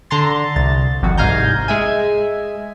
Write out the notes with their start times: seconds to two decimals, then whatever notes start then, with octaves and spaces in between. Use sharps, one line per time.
0.11 D3 A5 A#5 C6 A6
0.56 C2 A6
1.02 G#1 F2 F#4
1.17 C2 G#2 F5 G#5 A#5 G6
1.68 G#3 E5 G#5